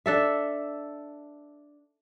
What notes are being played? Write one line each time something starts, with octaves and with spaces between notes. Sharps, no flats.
D4 A4 E5